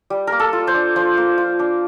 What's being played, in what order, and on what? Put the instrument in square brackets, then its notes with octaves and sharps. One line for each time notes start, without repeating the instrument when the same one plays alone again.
[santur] G3
A#3 A#4
A4
F4
C5
D4
F3 C5
A#3
F4
D4